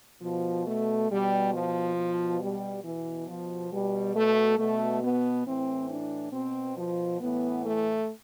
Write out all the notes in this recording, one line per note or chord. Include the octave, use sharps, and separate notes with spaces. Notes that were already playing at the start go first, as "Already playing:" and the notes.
B2 F3
A3
B2 G3
F3
B2
G3
B2 E3
F3
B2 G3
A3
B2 A3
B3
A2 E3 C4
D4
B2 C4
F3
A2 E3 B3
A3